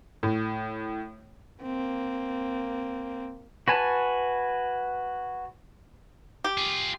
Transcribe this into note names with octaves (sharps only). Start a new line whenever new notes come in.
A2
A#3 C4
F#4 B4 G#5 A5
G4
F4 G#4